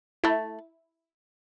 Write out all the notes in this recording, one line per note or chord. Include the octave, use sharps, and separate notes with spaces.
A3 E4